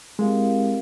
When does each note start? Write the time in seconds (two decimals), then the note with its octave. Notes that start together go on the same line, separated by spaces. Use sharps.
0.18 G#3 C4 E4 G4 A#4 F5